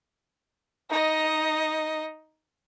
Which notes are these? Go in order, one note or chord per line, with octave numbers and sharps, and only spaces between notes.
D#4 D#5